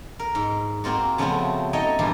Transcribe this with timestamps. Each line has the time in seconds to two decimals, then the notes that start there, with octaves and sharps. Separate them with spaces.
0.19 A#4
0.35 G#2
0.84 A#3 C4 F4 F#4
1.18 C#3 F3 A3 B3 C4 F#4
1.73 D#4 A4 C#5 D#5 G5
1.99 E2 G2 A#2 E3 F3